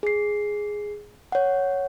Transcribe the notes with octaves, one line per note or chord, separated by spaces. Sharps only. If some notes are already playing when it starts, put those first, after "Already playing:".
G#4 C7
C#5 F#5